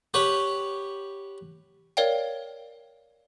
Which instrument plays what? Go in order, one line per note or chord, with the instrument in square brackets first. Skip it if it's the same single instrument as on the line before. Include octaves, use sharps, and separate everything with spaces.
[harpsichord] G4 B4 C#5 F#5
[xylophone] A#4 C#5 D5 F5 G5